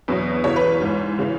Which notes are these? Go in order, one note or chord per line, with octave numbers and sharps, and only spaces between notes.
E2 B2 F#3
E2 C#3 E3 C#5
B4
G#2 E3
C#3 E3